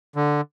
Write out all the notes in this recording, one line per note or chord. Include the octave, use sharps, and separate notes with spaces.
D3